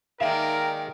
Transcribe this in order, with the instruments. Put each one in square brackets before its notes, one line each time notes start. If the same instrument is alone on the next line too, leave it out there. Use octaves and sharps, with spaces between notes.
[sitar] D#3 G#3 A#3 [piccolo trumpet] A#4 [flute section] D5 G5 [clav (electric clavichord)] E5 F5